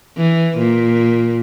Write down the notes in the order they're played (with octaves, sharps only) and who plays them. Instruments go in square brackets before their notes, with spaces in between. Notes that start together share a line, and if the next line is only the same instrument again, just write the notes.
[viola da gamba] E3
A#2